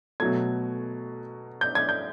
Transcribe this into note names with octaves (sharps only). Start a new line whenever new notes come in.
B2 F#3 A3 G#6
G6
G#6
G6